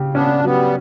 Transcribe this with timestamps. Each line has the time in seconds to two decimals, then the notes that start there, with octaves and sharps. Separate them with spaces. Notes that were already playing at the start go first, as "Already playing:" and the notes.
Already playing: C#3 G4
0.14 B3 C#4 D4
0.44 F#3 G3 B3